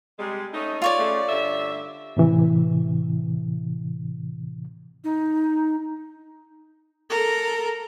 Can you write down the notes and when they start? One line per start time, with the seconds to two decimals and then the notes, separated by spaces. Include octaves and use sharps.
0.18 C3 G3 G#3
0.53 A3 C#4 D#4
0.82 F4 C#5 D5
0.98 C#3 A3
1.29 G2 D3 E5
2.17 A2 C3 E3
5.04 D#4
7.10 A4 A#4